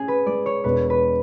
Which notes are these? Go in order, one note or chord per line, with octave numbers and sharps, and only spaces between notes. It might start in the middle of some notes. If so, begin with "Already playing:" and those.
Already playing: C#4 G#4
B4
G#3 D5
C#5
E1 B4
B4